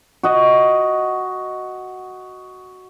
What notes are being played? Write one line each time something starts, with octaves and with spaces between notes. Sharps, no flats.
F#4 D#5